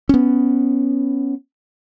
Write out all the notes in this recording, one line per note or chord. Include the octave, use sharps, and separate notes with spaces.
B3 C#4